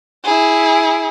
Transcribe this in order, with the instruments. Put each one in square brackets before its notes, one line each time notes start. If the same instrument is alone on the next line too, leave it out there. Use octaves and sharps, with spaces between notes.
[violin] E4 G#4